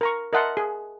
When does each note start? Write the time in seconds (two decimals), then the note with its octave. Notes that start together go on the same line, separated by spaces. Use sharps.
0.01 A#4 A#5 C#6
0.33 A#4 D#5 E5 F#5 A5 C6
0.57 G#4